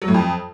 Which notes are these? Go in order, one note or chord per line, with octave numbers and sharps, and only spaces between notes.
F#3
A2
F2